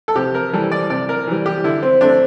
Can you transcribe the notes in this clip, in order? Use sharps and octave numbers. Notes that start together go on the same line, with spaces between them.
A4
C3 G4
A#4
E3 G3 A4
D5
C3 D5
A#4
E3 G3
G4
D3 E4
C4
A3 C4 D4